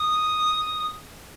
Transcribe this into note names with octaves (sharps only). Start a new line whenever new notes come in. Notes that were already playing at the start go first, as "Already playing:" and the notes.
Already playing: D#6